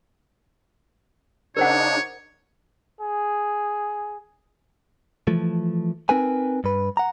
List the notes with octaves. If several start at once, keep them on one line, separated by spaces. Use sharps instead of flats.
C#3 D4 D#4 A#4 C5 C#5 F#5
G#4
E3 F3 A3
C4 D#4 A#4 B4 G#5
G2 B4
F#5 A#5